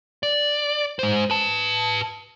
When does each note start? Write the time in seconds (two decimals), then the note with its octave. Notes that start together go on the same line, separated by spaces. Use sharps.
0.23 D5
0.99 G#3 C5
1.30 B4 A5